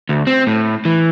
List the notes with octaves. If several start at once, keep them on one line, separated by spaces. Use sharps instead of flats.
D2
C4
A2
E3